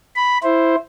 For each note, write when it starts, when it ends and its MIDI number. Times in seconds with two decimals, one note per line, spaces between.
0.15 0.38 83
0.43 0.76 64
0.43 0.76 72